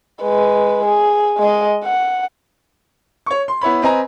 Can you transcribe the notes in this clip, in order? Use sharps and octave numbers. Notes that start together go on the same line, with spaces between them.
G#3 B4
G#4
G#3 D#5
F#5
C#5 C#6
C6
B3 E4 C#5 B5
C4 B4 D#5 G#5 A#5 B5